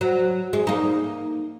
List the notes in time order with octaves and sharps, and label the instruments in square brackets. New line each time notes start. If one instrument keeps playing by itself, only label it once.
[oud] F#3
G#3
A#3 D#4